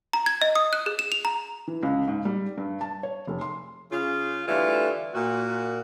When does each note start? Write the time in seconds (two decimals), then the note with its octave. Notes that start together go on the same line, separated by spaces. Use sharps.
0.13 A#5
0.26 G#6
0.42 D#5
0.56 D#6
0.73 F#6
0.86 G#4
0.99 E7
1.12 F7
1.25 A#5
1.68 E3
1.83 C#2
2.08 G#2
2.25 G3
2.58 G2
2.81 A5
3.03 C#5
3.27 F1
3.41 C6
3.91 C#3 F4
4.48 D3 E3 G3 A3 F4
5.14 A#2 F#4